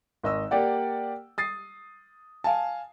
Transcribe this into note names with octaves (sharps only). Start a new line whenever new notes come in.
G#1 D#5 E6
A#3 G4 D5 F#5
D#6 A6 C7
F5 G#5 A5